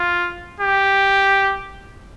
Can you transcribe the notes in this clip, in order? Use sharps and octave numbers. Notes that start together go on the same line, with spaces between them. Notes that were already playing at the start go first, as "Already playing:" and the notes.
Already playing: F4
G4